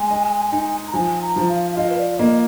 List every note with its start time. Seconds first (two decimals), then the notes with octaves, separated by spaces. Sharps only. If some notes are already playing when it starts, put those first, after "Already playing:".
Already playing: G#3 G#5
0.11 D#5
0.52 D#4
0.87 A#5
0.94 F3 G#5
1.22 A#5
1.36 F3
1.49 F5
1.72 F5
1.77 F4 D#5
1.90 B4
1.98 D5
2.19 A#3 D#5